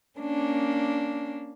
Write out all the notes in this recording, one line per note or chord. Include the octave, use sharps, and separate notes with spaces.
A#3 C#4 D4